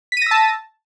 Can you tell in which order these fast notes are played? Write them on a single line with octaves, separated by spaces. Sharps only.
B6 D#7 A#6 E6 A5